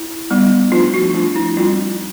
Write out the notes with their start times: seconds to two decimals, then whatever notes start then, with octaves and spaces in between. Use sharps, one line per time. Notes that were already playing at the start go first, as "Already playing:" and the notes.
Already playing: E4
0.31 G3 B3 D#4
0.72 F3 A3 D4 F4
0.94 F#4
1.14 F3 A3 D4 F4
1.36 E4
1.57 G3 C4 D#4 F4